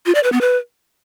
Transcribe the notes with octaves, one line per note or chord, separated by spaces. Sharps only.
F4
D5
B4
B3
B4